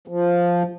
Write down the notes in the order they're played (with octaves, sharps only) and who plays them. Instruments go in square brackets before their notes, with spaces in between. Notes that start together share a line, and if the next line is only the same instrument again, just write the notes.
[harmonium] F3